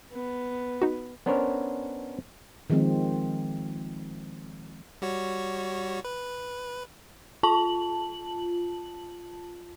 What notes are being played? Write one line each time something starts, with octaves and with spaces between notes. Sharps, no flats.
B3
D#4 F#4
B3 C#4 D4 A#4 C5 C#5
D#3 F3 G#3 C4
G3 F#4 C#5
B4
F4 A5 F#7